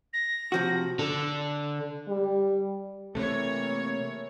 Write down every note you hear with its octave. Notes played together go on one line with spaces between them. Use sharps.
A#6
C3 F3 F#4
D3 A4
G3
C3 E3 A3 A#3 C#5